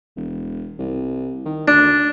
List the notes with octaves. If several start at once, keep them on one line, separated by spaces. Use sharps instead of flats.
E1
C2
D#3
D2 D4